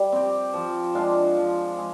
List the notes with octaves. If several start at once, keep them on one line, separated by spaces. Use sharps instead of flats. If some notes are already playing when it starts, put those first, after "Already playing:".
Already playing: G3
C4 G4
F3
G#3 D4 F4
F3
G#3